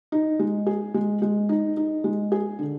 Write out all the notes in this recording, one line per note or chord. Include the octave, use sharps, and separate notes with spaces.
D#4
G#3
G#4
G#3
G#3
D#4
D#4
G#3
G#4
D3